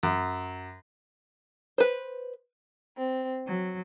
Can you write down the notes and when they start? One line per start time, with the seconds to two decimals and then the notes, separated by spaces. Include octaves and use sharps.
0.03 F#2
1.78 B4 C5
2.97 C4
3.46 F#3